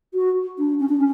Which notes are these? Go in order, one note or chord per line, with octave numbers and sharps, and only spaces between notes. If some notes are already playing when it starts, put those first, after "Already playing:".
F#4
D4
C#4
D4
C#4